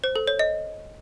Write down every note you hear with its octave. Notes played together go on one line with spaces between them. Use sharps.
C5
A4
C#5
D#5